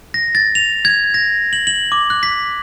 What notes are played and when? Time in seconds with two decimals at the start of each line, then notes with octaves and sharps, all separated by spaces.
0.14 A#6
0.35 A6
0.55 F7
0.85 G#6
1.14 A#6
1.53 F#7
1.67 F#7
1.92 D6
2.10 F#6
2.23 B6